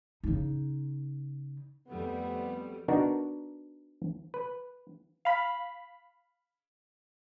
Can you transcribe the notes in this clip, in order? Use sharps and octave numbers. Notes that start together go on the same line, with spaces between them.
C#3 D#4
F2 G3 A3 B3
B3 D4 D#4 F#4 A#4
B4
F5 B5